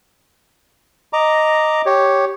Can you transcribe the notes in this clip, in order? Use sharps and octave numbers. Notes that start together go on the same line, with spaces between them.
D#5 A#5 D6
G4 C#5